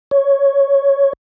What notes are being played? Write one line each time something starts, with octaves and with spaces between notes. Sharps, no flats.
C#5